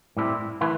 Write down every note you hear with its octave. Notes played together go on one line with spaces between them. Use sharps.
A2 G3 C4 E4
E3 A3 E4 B4